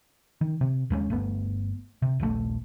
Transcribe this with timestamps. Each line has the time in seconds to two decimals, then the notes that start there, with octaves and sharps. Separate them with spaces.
0.41 D#3
0.61 C3
0.90 D#2 G3 G#3 C#4
1.10 G1 A3 B3
2.02 C3
2.20 D#1 A#1 D#3 A3